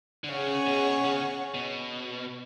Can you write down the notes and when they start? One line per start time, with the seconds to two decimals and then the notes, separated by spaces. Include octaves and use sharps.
0.24 D3
0.29 C#3 C#4 G#4 C#5 F#5
0.66 B2
1.04 C#3
1.54 B2